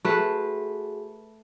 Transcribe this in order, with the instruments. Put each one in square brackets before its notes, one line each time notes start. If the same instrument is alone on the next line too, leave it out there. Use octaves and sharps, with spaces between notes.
[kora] A3 B4 [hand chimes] F#4 G#4